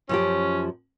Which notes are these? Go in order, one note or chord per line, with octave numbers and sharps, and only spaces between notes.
F#2 F3 C#4 G4